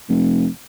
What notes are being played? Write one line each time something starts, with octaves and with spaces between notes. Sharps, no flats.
F1